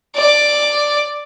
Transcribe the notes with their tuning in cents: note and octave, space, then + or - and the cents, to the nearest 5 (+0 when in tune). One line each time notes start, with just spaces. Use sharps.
D5 +5